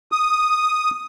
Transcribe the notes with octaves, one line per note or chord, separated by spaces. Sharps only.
D#6